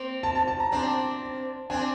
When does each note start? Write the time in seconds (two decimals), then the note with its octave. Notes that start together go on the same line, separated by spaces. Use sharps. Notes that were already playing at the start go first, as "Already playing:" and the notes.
Already playing: A#3 C4
0.23 A5
0.35 A5
0.47 A5
0.60 A#5
0.72 C4 D4 A5
1.70 C4 D4 G#5